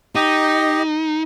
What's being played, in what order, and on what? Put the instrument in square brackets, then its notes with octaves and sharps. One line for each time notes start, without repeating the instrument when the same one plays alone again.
[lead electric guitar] D#4 [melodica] G4 D#5